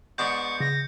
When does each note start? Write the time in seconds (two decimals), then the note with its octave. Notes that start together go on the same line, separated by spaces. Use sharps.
0.18 G#2 B3 D4 C#6 G6 C#7
0.60 C#3 A#6